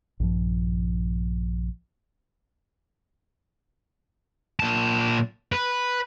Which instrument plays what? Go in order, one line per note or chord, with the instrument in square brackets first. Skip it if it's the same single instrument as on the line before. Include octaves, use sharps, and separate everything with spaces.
[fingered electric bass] A#1 G2 F3
[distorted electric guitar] A#2 A5
B4